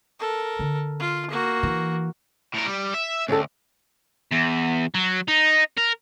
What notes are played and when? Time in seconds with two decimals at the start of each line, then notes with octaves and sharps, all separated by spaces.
0.19 A4 A#4
0.59 D3
1.00 F4
1.30 A#3 F#4
1.63 E3
2.54 A2 A#4
2.66 G3
2.94 E5
3.28 D2 C#4 G4 A4
4.31 E2
4.95 F#3
5.28 D#4
5.77 A#4